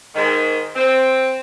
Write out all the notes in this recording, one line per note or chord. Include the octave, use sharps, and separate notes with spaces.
G#2 D#3
C4